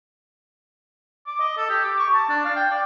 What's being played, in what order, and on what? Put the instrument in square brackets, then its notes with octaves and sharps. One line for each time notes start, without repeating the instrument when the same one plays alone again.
[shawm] D6
D#5
A4
G4
D6
C#6
A5
D4
F5
G5
D5